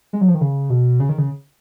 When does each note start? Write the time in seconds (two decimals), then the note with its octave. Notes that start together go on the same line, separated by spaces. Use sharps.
0.13 G#3
0.21 F#3
0.28 F3
0.34 D#3
0.41 C#3
0.70 B2
1.00 C#3
1.09 D#3
1.18 C#3